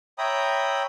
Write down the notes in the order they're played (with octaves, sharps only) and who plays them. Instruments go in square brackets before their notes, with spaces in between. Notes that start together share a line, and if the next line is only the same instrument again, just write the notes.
[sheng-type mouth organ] C#5 E5 G5 A#5 B5 D#6